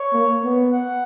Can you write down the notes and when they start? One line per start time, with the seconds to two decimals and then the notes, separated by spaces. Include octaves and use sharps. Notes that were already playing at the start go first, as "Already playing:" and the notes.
Already playing: C#5
0.13 A#3
0.44 B3
0.73 F#5